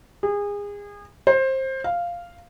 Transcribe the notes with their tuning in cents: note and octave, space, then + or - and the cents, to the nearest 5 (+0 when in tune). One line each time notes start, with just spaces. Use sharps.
G#4 -30
C5 +20
F5 -5